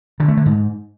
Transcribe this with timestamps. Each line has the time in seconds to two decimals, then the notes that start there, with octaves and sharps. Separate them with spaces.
0.20 D3
0.28 A3
0.37 D3
0.46 G#2